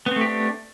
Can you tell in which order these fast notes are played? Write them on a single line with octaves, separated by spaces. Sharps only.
B3 C4 A3 G4 D4